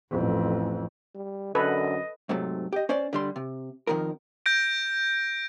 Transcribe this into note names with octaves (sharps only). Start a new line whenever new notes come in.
A1 F2
G3
F#2 D3 A4 B4 D#5
G#2 C3 F#3 A3
G4 D#5
C#4 C5 D5
D3 G3 C6
C3
F2 C3 D#3 F3 A#4
G6 A#6 D7